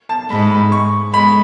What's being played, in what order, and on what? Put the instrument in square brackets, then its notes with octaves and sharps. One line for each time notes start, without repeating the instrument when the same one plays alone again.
[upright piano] A5
[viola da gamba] G#2 [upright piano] B5
[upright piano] B5
C#6
[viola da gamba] G#3 [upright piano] B5